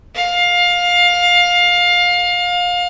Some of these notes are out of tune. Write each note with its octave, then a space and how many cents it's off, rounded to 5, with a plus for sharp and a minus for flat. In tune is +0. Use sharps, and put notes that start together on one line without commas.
F5 +20